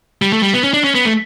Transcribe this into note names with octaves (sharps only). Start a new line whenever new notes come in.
G3
A3
G3
B3
C#4
D4
C#4
B3
A3